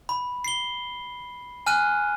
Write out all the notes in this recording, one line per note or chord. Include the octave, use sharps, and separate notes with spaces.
B5
C7 G7
G#5 F6 F#6 D#7